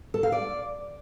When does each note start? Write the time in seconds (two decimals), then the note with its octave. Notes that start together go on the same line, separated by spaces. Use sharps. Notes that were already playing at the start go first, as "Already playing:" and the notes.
0.14 A4
0.23 F5
0.32 D5